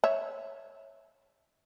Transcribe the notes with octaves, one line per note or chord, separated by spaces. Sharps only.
C#5 E5